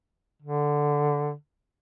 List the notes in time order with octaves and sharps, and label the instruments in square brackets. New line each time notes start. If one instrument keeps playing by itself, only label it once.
[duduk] D3